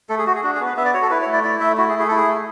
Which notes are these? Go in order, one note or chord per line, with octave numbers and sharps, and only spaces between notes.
A3 A4
G#4
F#4
G#4
D4 F#4
G#4
B3
B4
B3 E5
D5
F#4 C#5
A4
E4 B4
C#5
A3
D5
E4 D5
A3 E5
E4 F#4
G#4
A3
G#4
E4 A4
G#4
A3